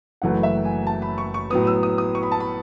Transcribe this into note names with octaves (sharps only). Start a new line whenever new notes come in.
F#1 F#2 E3 A3 F#5
E5
G#5
A5
B5
C#6
C#6
A2 F#3 B3 D#6
E6
D#6
D#6
C#6
B5
A5
B5